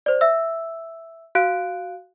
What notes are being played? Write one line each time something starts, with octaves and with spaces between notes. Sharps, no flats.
C5 D5
E5 E6
F#4 F5 F#6 D7